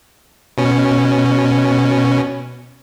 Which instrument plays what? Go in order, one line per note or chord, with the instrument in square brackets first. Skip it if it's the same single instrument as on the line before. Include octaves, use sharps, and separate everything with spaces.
[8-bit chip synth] B2 C#4